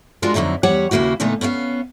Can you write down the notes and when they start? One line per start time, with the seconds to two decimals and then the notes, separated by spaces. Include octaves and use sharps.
0.22 G#3 D4 F4 F#4 A#4
0.34 F2 D3 F#3 D#4 E4
0.63 E2 G3 G4 C#5 F#5
0.91 D#2 C#3 A#3 E4 F#4
1.20 A#2 D3 A3 B3 D#4
1.41 B3 C#4 A4 F5